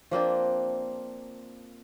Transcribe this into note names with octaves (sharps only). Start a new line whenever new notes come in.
F3 A#3 C4 D4